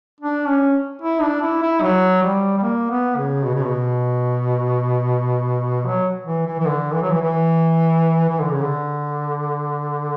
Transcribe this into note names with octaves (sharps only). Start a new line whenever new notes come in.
D4
C#4
E4
D4
E4
E4
F#3
G3
G3
A#3
B3
C#3
B2
C#3
B2
F#3
E3
E3
E3
D3
E3
F#3
E3
E3
E3
D3
C#3
D3